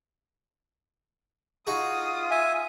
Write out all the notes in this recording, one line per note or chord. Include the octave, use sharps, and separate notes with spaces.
D#4 F4 F#4 G#4 D#6
E5 G#5